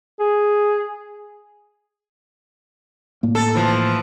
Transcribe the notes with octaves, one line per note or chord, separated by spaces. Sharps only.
G#4
A2 A#3
A4
E3 F3